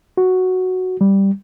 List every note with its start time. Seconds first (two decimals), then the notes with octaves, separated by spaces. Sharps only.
0.17 F#4
1.01 G3